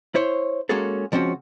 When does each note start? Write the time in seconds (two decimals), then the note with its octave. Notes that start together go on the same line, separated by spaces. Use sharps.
0.15 E4 C5 C#5
0.69 G#3 A#3 C#4 F#4 G#4 A4
1.12 C#2 F3 C4 C#4 F#4